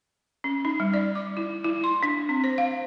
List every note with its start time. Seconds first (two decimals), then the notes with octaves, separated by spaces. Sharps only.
0.44 C#4
0.65 D#4
0.80 G3
0.94 D5
1.15 D6
1.37 E4
1.64 E4
1.84 C6
2.03 D4
2.29 C4
2.44 C5
2.58 F5